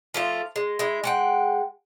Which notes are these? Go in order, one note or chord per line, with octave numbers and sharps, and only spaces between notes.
F3 A3 F4
G#3
G#3 E4
G#3 F#5 G5